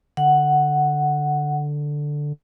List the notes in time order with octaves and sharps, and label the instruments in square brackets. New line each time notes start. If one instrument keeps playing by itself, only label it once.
[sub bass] D3 [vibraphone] F#5